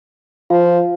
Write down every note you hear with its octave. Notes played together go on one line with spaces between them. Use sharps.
F3 F4 F5